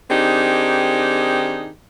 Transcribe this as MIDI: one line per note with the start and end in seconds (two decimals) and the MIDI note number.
0.10 1.69 51
0.10 1.69 60
0.10 1.69 62
0.10 1.69 63
0.10 1.69 67
0.10 1.69 68